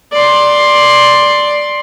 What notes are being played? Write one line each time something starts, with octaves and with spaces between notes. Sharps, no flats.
D5 C6